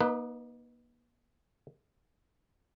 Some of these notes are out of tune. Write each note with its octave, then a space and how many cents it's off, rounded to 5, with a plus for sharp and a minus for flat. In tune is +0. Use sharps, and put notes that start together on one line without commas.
A#3 +45 D#4 +0 B4 +0